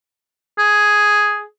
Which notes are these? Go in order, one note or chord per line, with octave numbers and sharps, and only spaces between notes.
G#4